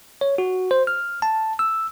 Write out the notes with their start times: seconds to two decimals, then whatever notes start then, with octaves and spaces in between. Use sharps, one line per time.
0.21 C#5
0.38 F#4
0.71 C5
0.87 F6
1.22 A5
1.59 E6